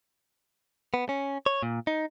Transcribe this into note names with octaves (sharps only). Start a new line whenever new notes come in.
B3
C#4
C#5
A#2
D#4